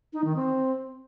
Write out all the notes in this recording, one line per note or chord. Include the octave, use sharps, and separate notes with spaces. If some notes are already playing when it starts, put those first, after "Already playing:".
D#4
D#3
C4